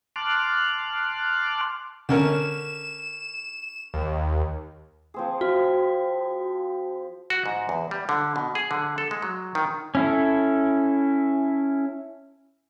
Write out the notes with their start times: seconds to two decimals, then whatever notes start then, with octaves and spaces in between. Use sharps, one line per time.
0.16 A5 C6 D6 F6 F#6
2.09 D3 C#4 A#4 E7
3.94 D#2
5.14 F3 C4 G#4
5.41 F#4
7.30 F#4
7.46 G#2
7.69 E2
7.91 G3
8.09 D3
8.36 B2
8.55 G#4
8.71 D3
8.98 A4
9.11 G#3
9.22 F#3
9.55 D#3
9.95 C#4 E4 A4